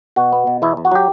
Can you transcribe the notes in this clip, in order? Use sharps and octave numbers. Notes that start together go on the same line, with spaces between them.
B2 F#4
B3
B2
E2 E4
E2
F#4
F#3 G4